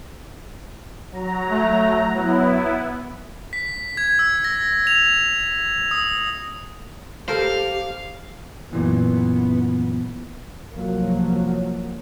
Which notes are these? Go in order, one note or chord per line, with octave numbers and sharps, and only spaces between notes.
F#3 A#5
A3
F#3 B3 E4
B6
G#6
E6
A#6
F7
D#6
G4 A4 A#4 C5 F5
F#2 A#2 E3 B3
C2 G#2 F3 F#3 A#3